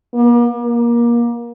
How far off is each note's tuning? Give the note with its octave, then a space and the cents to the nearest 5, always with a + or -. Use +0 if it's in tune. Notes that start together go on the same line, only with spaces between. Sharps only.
A#3 +45
A#3 +25